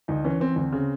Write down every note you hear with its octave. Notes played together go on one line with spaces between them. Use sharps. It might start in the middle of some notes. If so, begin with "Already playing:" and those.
D2 D#4
E3 C#4
E3 C4
D2 C4
C#3